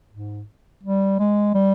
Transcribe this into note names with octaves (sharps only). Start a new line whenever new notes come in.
G#2
G3
G#3
G3